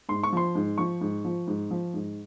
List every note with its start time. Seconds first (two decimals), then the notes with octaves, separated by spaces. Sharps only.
0.09 G#2 C6
0.23 C#6
0.33 F3 C6
0.55 G#2
0.78 F3 C#6
1.01 G#2
1.25 F3
1.47 G#2
1.71 F3
1.94 G#2